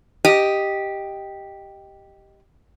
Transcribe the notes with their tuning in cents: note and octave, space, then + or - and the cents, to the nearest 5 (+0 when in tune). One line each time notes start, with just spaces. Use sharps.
G4 +0 D#5 +0